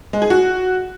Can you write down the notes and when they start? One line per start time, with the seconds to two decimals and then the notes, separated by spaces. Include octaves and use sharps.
0.13 G#3
0.22 G#4
0.30 F#4